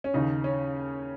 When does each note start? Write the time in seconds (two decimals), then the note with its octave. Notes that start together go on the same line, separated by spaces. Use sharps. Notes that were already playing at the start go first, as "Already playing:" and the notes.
0.04 C#4
0.14 D#2 C#3 D#4
0.44 C#4